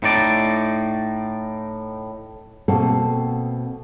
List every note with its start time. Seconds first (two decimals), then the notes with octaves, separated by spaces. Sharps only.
0.03 A2 D#4 D5
2.68 B2 A#3 C4 A4